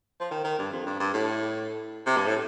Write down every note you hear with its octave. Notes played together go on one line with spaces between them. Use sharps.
F3
D#3
D#3
G2
F2
G2
G2
A2
C3
G2
A2